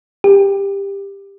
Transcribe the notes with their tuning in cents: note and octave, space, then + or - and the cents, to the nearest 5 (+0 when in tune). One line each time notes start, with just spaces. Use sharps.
G4 +15